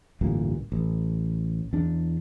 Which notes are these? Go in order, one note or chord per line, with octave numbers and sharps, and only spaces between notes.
A1 D2 G2 A#2
A1
E2 D4